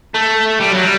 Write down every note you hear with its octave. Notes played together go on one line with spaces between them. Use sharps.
A3
G3
F#3
G3